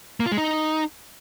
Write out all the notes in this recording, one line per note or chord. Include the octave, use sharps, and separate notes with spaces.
A#3
F4
G#3
D#4